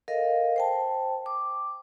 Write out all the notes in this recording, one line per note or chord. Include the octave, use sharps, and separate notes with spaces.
A4 A#4 D#5 F5
C5 G5 A5
D6